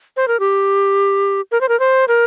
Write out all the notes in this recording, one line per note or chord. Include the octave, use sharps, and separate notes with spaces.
C5
A#4
G4
A#4
C5
A#4
C5
A#4